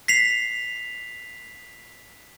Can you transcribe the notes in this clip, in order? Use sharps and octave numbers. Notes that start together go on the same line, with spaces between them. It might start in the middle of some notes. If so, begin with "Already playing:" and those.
B6 C7 F7